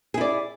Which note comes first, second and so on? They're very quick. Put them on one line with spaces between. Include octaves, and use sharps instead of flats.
G#4 E4 D5